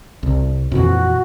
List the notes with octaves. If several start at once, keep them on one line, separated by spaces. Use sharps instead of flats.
C2
F2 A#2 E3 F#4